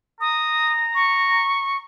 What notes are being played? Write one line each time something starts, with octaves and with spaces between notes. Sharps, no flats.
A#5 D#6
C#6